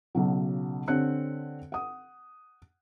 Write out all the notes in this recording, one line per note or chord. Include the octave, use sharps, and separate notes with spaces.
B1 C#3 F#3
D3 C4 G4 C#5 F#6 C#7
F#5 D#6